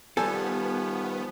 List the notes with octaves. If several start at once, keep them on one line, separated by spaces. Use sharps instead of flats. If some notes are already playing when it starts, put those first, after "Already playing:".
D#3 F3 G3 B3 G4 A4 G#5